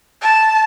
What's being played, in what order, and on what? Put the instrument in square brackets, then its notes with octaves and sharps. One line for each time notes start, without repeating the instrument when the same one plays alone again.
[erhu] A5